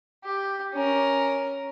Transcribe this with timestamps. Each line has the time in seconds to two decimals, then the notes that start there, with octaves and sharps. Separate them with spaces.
0.25 G4
0.73 C#4 A#4